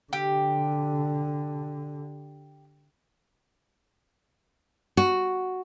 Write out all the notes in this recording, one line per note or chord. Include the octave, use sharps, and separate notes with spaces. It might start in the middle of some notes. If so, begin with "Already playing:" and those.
D3 G4
F#4